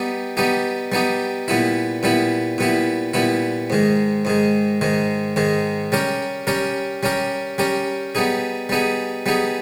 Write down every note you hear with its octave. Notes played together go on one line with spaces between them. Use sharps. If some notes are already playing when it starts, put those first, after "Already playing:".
Already playing: G3 B3 D#4 G4
G3 B3 D#4 G4
G3 B3 D#4 G4
A#2 G3 B3 E4
A#2 G3 B3 E4
A#2 G3 B3 E4
A#2 G3 B3 E4
G#2 D#3 G#3
G#2 D#3 G#3
G#2 D#3 G#3
G#2 D#3 G#3
G3 C#4 G4 A#4
G3 C#4 G4 A#4
G3 C#4 G4 A#4
G3 C#4 G4 A#4
G3 B3 D#4 G#4
G3 B3 D#4 G#4
G3 B3 D#4 G#4